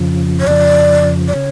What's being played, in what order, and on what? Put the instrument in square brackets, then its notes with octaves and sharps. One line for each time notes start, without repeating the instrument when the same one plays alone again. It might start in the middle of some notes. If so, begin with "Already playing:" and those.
Already playing: [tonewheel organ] F2 C#3 F3
[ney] C#5
[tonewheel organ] F2 C#3 F3 [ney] D5
[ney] D5
[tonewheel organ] C#3 [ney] C#5